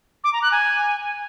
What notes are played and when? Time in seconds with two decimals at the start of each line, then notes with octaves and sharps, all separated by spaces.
0.24 D6
0.33 A#5
0.43 F#6
0.52 G#5